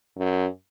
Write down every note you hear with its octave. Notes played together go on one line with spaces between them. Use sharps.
F#2